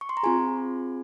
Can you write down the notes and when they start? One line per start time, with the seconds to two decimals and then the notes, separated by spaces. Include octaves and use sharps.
0.01 C#6
0.09 C6
0.17 A#5
0.23 C4 F4 G#4 G#5